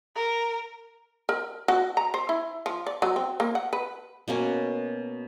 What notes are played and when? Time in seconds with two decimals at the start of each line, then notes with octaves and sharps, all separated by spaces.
0.16 A#4
1.29 A#4
1.68 F#4
1.97 A#5
2.14 C5
2.29 E4
2.66 F3
2.87 D5
3.02 F#3
3.16 C4
3.40 A#3
3.55 F#5
3.73 B4
4.28 B2 A#3 C#4